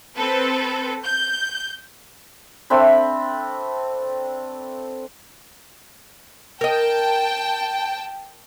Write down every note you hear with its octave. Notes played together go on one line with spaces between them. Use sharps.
C4 A4 B4
G6
A3 C4 D4 B5
A#4 D#5 G5 A5